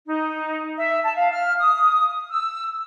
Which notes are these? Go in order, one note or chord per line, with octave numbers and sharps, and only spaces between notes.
D#4
E5
A5
F5
F6
D#6
E6